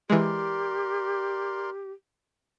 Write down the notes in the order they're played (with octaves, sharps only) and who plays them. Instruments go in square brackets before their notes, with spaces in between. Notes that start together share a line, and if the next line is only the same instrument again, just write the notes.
[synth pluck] E3 G#3 [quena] G4 [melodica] A#4 D5 C6